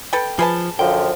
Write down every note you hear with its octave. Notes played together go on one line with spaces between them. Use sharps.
A4 B4 G5
F3 G#4 B4 A5
F#2 D3 F3 G5